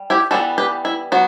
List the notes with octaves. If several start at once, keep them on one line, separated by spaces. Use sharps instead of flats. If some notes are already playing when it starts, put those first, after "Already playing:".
Already playing: G3
E4 G4
E3 G3 B3 F#4 A4
G4 B4
E4
F#3 B3 F#4